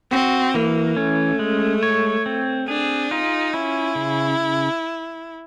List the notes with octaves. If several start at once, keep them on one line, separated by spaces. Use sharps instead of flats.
C4 F#4
E3 A#3
A3 C#4
G#3
C#5
C4
D4 G#4
D#4 F4
C#4 E4
C#3